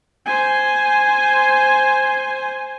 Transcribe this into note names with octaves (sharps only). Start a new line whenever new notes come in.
C5 G#5